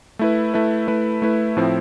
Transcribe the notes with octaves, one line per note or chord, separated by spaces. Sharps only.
A3 E4 B4
A3 E4 B4
A3 E4 B4
A3 E4 B4
A2 F3 C4 E4